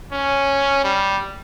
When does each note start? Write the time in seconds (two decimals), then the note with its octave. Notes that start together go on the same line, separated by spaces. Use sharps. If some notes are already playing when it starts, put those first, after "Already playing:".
0.12 C#4
0.84 G3